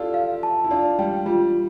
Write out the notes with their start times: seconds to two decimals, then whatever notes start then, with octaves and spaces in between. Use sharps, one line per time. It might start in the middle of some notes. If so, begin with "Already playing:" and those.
Already playing: E4 F4 G4 A4 D5
0.14 F5
0.43 A5
0.64 E4
0.71 D4 F4 D5
0.99 G3 G5
1.26 G3 F4